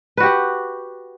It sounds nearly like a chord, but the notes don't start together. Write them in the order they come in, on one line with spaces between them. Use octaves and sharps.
B4 F#4 G4 F#5